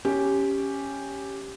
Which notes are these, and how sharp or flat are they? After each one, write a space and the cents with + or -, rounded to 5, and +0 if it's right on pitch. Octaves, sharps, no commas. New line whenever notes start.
C#4 +0 G4 +0